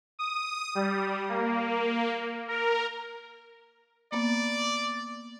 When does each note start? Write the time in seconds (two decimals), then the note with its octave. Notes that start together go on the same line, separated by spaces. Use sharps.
0.19 D#6
0.75 G3
1.29 A#3
2.48 A#4
4.12 A#3 B3 D5